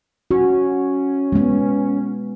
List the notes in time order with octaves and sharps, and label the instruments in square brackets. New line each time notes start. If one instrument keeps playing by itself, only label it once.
[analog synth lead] C#4 [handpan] F#4
[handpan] G#3 B3